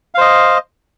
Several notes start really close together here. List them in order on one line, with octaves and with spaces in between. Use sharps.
F5 C5 D#5